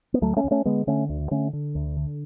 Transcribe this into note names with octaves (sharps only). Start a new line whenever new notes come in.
B3
D2 F#3 A3
A3 C#4
D2
A3 C#4
D3 G#3 B3
D3 A3 C#4
D2
D3 A3 C#4
D3
D2
D3